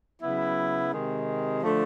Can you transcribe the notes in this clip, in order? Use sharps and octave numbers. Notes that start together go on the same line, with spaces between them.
C#3 F#3 B3 E4
C3 D#3 G#3
D3 F3 A3